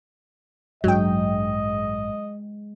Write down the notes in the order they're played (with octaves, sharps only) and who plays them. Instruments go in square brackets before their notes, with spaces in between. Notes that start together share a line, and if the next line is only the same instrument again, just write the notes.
[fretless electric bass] A1 G2 D4 [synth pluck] F#3 G5 [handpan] G#3 [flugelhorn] D#5